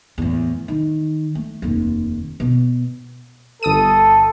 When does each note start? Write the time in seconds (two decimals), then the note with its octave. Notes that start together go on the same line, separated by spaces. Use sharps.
0.18 E2 A2
0.68 D#3
1.35 A3
1.62 F1 D#2
2.40 B2
3.63 G1 A4 D#6 D#7